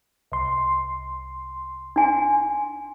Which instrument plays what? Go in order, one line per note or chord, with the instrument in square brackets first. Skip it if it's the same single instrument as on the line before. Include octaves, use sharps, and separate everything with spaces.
[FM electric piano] C2 C6
[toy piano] D4 G#5